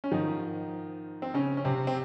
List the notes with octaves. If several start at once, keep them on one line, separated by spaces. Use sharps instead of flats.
C#4
G#2 D#3 F3 D#4
C4
C#3 C#4
C#4
C3 C4
C4